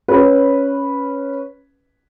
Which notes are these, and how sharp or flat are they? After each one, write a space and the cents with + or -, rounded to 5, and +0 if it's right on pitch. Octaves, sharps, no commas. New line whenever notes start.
C#4 +0 B4 -5